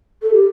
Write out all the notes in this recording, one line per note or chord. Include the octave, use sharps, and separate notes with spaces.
A4
G4